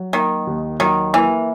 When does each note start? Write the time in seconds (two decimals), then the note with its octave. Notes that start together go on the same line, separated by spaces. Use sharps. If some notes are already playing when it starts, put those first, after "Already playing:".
Already playing: F#3
0.13 D#3 A#3
0.47 D#2
0.80 D#3 F#3
1.14 E3 A#3